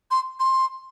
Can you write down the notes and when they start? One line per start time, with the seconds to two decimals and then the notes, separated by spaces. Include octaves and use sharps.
0.11 C6
0.39 C6